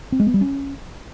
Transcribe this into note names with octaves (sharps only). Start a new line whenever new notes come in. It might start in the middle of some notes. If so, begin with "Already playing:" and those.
C4
G#3
B3
G3
C#4